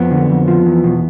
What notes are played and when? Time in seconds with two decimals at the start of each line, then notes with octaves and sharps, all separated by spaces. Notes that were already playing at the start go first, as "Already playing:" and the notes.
Already playing: F2 B3
0.11 D3
0.29 F2
0.48 F3
0.66 E2
0.84 B2